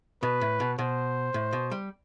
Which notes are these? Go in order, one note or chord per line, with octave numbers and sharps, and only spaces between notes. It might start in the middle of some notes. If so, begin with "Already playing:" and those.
B2 B4
A2
B2
B2 C5
A2
B2
G3